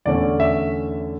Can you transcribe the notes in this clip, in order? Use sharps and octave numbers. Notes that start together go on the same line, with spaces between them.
E2 D3 A3 C#4 D5
E5